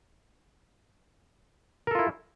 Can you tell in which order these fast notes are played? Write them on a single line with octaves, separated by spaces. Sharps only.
A#4 A4 F4 E4